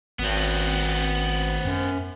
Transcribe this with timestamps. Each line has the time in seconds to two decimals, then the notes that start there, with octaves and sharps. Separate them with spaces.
0.19 G#1 B3 C4
1.65 F#2